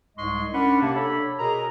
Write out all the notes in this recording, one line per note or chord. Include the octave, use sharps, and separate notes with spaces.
C2 G#2 G#3 D#5 C6 C#6
C#4 D4 A#4 F#5 B5
C3 A#3 A5
D4 A4 C#5 B5
B2 G#4 A#4 A#5